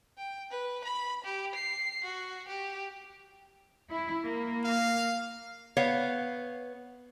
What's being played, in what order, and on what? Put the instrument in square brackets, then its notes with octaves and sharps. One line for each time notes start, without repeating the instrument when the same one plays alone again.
[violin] G5
B4
B5
G4
C7
F#4
G4
[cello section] E4
A#3
[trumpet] F5
[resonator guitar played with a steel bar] B3 C#5 F5